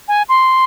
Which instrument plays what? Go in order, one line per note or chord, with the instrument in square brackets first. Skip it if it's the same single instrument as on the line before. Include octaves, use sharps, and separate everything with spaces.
[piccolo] G#5
C6